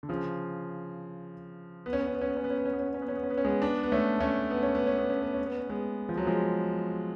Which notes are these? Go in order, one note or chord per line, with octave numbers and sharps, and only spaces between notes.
D3
C#3 F3
B3
C#4
B3
C#4
B3
C#4
B3
C#4
B3
C#4
B3
C#4
B3
C#4
B3
C#4
B3
C#4
B3
C#4
B3
C#4
G#3 B3
B3 D4
B3
A3 C#4
A3 C#4
B3
C#4
B3
C#4
B3
C#4
B3
C#4
B3
C#4
G#3 B3
F3
F#3
F3 G#3